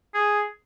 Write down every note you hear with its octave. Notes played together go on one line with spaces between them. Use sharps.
G#4